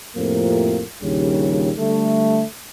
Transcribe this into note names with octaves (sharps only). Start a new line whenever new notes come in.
F2 A2 C3 F3 A#3
A#1 D#2 C#3 G3
D3 G3 A3